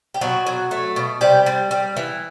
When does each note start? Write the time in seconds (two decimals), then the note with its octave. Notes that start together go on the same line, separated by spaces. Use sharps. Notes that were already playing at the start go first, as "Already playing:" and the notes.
0.14 G4
0.21 B2 F#3 F#4
0.47 F#3
0.71 A3
0.96 B2
1.21 C3 G3 G4
1.46 G3
1.71 G3
1.97 E3